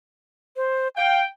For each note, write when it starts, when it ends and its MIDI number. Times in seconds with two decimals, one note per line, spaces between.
0.56 0.88 72
0.96 1.20 77
0.96 1.23 79